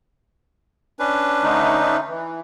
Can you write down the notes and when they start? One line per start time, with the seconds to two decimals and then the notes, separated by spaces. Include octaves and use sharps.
0.99 C#4 D4 B4
1.43 D3 A3 D#4
2.07 E3